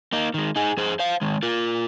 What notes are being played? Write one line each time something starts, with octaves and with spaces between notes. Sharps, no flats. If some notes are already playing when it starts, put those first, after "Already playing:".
A#3 D#4
D#3 G#3
D#4 G#4
F2 G#4 C5
C5 F5
D#3 G#3
F4 A#4